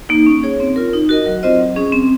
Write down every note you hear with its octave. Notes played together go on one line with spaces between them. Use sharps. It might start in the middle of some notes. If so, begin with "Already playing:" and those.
A#3 D#4
C#4
G#4 C#5
C4
F4 A#4
D#4
F#4 A#4 D#5
F#3
C4 F4 C5 D#5
F#3
C#4 G#4
C4